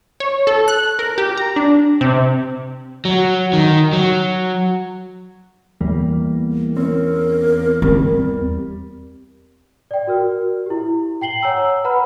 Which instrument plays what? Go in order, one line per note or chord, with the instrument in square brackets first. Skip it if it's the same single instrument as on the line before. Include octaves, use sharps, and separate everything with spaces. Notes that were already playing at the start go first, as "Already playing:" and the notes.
[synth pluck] C#5
A4
F#6
A#4
G4
A#5
D4
C3
[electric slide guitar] F#3
D#3
F#3
[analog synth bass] E2 [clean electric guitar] G3 A#3
[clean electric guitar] C4 C#4 [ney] A#4
[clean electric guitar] G3 [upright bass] C4
[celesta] D5 G5
F#4 A#4 F6
E4 G4
G5 C7 F#7 G7
C#5 F#5 G#5 A#5 E6
B4 F#5 A#5 B5 F6